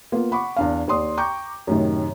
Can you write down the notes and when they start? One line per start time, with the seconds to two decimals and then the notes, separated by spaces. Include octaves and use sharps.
0.12 A#3 B3 F4
0.31 F#5 B5 C#6 D6
0.56 E2 D4 F5
0.88 D#2 D5 C6 D#6
1.17 G5 A#5 C#6 D6 G6
1.67 F#2 A2 C3 D#3